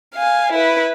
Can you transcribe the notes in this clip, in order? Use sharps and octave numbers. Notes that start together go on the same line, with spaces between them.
F5 G#5
E4 B4